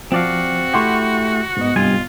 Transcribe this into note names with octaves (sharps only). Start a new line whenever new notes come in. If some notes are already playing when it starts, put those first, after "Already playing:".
F3 C4 F#4 D5 F5
A3 E4 G4 F#5 C6 C#6
G#2 B3 D#5
C2 G2 F4 G#5